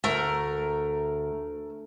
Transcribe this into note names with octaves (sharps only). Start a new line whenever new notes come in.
D2 A3 A#4